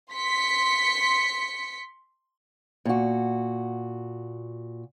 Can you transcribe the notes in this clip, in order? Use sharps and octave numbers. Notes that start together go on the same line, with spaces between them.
C6 B6 C#7
A#2 F#4